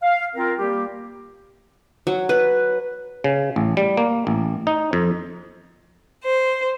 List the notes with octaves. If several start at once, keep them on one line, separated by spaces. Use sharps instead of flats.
F5
C4 F4 A#4
G3 A#3 G4
F#3
B4
C#3
A1
G3
A#3
A1
D#4
F2
C5